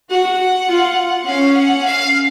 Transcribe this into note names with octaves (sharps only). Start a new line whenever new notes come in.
F#4 F#5
F4
C#4 F5
F#5
F5